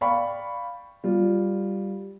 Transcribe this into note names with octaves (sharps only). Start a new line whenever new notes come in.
D5 F5 G5 B5 C#6
G3 F4